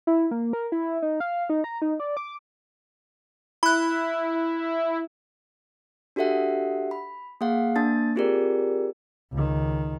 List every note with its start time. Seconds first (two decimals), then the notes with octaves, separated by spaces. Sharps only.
0.07 E4
0.31 A#3
0.53 A#4
0.72 E4
1.02 D#4
1.20 F5
1.50 D#4
1.64 A#5
1.82 D#4
2.00 D5
2.17 D6
3.63 E4 B5 F#6
6.16 D4 F#4 G4 A4 E5 F#5
6.91 B5
7.41 A#3 G#4 F5 F#5
7.76 A#3 D4 A5 A6
8.16 C4 F4 G4 G#4 A#4 D5
9.33 C#2 D#3